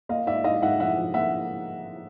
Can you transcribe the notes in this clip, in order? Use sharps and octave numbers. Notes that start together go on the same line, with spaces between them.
A#3 D#5 F5
G#2 D5 E5
G#2 D#5 F5
G#2 E5 F#5
F3 E5 F#5
F3
A#3 E5 F#5